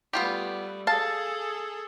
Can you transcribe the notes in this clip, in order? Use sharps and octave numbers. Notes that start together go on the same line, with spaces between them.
G3 A3 B3 F4 G4
G#4 A4 F5 A5